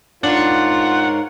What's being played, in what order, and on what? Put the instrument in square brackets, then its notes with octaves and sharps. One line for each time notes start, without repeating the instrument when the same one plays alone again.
[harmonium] G#2 A#4 C#5 [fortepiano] D4 [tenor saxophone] F4 [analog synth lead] F#5